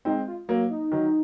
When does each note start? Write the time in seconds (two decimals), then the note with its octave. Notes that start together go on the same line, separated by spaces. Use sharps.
0.05 G#3 C4 D#4
0.27 F4
0.48 F#3 A#3 C#4
0.70 D#4
0.92 D#3 F#3